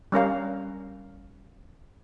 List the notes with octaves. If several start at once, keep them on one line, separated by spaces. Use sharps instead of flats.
G3 C#4 A#4 F5